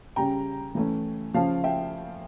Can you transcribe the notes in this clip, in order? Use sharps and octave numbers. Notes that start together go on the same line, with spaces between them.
C#3 G3 C#4 G5 A#5
E3 A3 C#4
C#3 F3 C#4 F5 A5
E5 G5